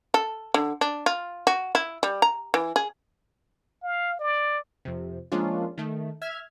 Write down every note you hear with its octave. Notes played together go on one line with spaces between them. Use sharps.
A4
D3
D4
F4
F#4
E4
G3
A#5
E3
G#4
F5
D5
F2 C3
F3 G#3 A#3 C#4 D4 F4
D#3 A3
E5 F6 G#6